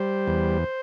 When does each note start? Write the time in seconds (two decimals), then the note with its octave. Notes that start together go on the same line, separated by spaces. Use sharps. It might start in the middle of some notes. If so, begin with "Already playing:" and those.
Already playing: G3 C5
0.28 E2